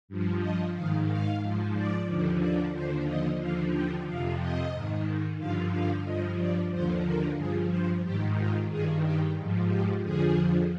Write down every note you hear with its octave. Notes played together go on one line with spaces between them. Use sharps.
G2 F3
D#5
G#2 D#3 F5
F5
G#2 F3
D5
D#2 D3 F3
D5
D#2 D3 F3 C5
D#5
D#2 D3 F3 F5
G5
F2 C3 F3 F5
D#5
G#2 D#3
G2 D3 F3 F5
F5
G2 F3 D#5
D5
D#2 D3 F3 C5
A#4
G2 F3 G#4
C5
G#2 D#3 G4
F4
G2 D#3 G#4
G4
G#2 F3
G4
F2 D3 F3 G#4